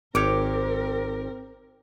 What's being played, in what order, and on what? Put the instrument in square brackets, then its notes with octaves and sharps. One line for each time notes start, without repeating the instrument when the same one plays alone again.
[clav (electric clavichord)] G#1 C#5 [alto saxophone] C4 [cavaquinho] G4 D6 [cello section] A#4